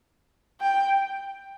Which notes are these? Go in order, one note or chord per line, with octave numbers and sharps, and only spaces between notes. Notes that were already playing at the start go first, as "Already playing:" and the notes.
G5